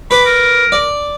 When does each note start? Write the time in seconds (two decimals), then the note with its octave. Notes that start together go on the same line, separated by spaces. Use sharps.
0.11 B4 B5 D6
0.25 A#4
0.72 D5